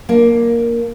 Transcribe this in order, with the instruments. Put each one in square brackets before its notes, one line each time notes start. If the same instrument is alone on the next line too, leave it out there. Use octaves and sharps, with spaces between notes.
[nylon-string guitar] A#3 D4